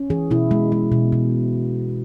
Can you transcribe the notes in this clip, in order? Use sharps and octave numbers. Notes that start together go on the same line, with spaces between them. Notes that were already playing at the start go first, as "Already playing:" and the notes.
Already playing: C#4
E3 G#4
B2 E4
G#3
G#3
B2
B2